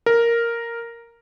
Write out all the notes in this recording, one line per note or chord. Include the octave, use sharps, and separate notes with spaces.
A#4